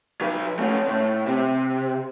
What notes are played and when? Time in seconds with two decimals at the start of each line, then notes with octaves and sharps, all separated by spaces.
0.21 F#3 B4
0.59 A3 C#4
0.88 A2
1.26 C3